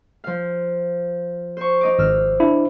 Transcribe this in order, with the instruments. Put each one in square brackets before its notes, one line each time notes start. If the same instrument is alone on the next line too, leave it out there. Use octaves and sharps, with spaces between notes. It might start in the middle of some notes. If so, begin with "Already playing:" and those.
[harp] F3 F5
C5 C#6
D#4 D#5 D6
[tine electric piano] G#1 [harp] E6 F6
[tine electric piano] D4 E4